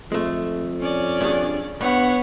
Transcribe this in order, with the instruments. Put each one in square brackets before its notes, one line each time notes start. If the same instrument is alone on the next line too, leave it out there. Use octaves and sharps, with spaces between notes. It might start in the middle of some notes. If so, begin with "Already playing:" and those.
[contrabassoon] F2 [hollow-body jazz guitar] G#3 A3
[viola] C#4 D5
[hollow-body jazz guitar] G2 D4 G#4
[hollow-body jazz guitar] G2 [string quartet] B3 F#5 [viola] C#5